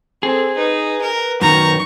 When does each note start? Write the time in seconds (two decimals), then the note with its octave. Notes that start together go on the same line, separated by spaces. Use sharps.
0.23 C4 G#4 A4
0.57 D#4 B4
1.02 A#4
1.41 F#2 D#3 A#5 C#6